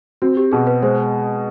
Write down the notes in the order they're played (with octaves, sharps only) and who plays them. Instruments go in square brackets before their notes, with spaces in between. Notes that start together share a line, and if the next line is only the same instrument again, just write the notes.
[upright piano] C4 [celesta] F#4
[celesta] G4
[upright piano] B2 [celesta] G#4
[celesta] B4
[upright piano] G#3 [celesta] C5